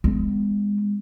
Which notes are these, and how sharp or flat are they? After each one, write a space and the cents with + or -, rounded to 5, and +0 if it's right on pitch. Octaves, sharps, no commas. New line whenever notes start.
G#3 -25 B3 +30